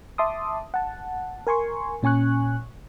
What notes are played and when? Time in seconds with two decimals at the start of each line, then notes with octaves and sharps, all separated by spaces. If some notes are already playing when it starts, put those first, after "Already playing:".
0.18 E5 A5 C6 D6 D#6
0.74 F#5 A5
1.47 A#4 G#5 C6 C#6
2.03 A#2 C#4 G#5 C#6 F#6